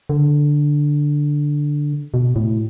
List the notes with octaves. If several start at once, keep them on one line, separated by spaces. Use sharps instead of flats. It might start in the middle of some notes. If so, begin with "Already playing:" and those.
D3
B2
A2